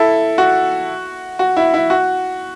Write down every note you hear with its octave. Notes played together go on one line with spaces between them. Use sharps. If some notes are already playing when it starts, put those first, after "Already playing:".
Already playing: E4 A4
F#4
F#4
E4
E4
F#4